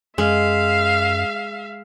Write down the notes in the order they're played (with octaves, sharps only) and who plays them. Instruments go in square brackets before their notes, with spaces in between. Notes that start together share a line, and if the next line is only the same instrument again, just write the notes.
[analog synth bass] F#2 [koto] G#3 [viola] E5 F5